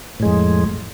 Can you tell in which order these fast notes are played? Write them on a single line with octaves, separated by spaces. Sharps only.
A2 G#3 F2